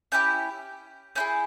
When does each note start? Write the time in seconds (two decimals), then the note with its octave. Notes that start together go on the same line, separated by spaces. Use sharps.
0.12 C#4 E4 G4 G6
1.15 C#4 E4 G#4 G6